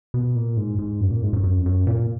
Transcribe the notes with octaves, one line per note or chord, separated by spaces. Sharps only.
B2
A#2
G#2
G#2
F#2
A#2
G#2
F#2
F#2
F2
F#2
A#2